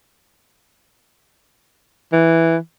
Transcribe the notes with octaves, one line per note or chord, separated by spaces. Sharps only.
E3